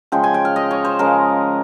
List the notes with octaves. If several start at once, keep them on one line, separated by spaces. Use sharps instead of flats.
C#3 F3 G#3 G5
G#5
G5
F5
D#5
C#5
C5
C#3 F3 G#3 A#4